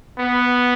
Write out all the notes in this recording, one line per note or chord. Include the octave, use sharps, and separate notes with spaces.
B3